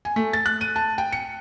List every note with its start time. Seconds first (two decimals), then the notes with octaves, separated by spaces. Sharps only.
0.05 G#5
0.16 A3
0.33 A6
0.46 F#6
0.61 D#7
0.76 A5
0.98 G5
1.13 C#7